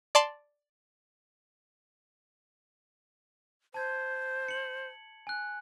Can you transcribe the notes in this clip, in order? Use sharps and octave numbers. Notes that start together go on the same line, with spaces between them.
D5 A5 C6
C5 A5 G#6
C#7 F#7
G#5 F#6